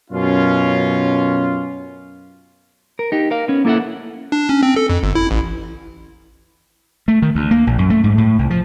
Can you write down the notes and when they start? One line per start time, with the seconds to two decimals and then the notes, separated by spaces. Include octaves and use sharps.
0.11 F#2 B2 C#4 F4
2.99 A#4
3.12 D#4 G4
3.31 A#4 F5
3.48 B3 C#4
3.65 A#3 E4 A4 E5 F#5
4.32 D4
4.49 C#4
4.63 C4
4.76 A4
4.89 F2
5.03 G1
5.15 E4
5.31 A1
7.08 A3
7.22 D#3
7.35 D2
7.51 A#3
7.67 A#1
7.78 F#2
7.90 A3
8.04 G#2
8.18 A2
8.39 C2
8.50 F3